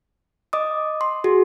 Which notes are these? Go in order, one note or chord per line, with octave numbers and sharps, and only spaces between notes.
D#5 D6 D#6
C6
F#4 G#4